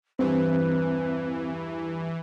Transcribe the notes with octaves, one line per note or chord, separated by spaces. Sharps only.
E2 G2 E3 C4 B4